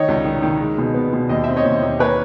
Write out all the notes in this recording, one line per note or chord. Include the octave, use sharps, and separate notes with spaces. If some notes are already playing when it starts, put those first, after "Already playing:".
Already playing: D#3 C#5 D#5
C#2
D#3
D#3
G#3
B2
B3
B2
D#2 D#5
C4 E5
C#5 D#5
D#2
D#2
A#3 B4 C#5